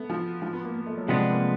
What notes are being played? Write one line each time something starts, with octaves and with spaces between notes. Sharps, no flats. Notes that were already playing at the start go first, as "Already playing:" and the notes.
Already playing: A3 B3
F3
F3
B3
A#3
A#3
A3
F#3
C3 F3 G3 G#3 B3 D4
G3
A#3